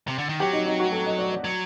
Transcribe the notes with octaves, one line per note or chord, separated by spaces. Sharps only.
C3
D3
D#3
F#3 G4
D#4
D#4
F#4
A4
D#5
D5
D5
F#3